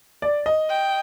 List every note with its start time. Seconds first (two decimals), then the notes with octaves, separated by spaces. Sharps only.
0.22 D5
0.46 D#5
0.69 G5